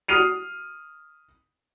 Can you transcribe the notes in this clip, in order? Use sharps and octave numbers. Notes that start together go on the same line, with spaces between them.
D#6 F6 C7 D#7 F7